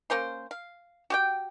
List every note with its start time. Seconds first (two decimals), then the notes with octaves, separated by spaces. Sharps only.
0.10 A#3 C#4 C5 C6
0.51 F5
1.10 F#4 G4 G5